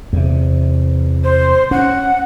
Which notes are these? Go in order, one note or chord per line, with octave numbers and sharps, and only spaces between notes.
E2 C3
C5
C#4 F#5